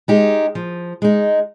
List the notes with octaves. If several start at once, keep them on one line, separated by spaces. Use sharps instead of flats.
G#3 D#4 G4
F3
G#3 D#4